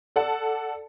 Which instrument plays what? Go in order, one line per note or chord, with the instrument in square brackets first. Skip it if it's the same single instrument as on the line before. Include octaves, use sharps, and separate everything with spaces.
[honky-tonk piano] A4 D5 F#5 A5